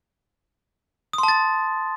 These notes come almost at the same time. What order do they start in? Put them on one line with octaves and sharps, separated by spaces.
D#6 C6 A5 A6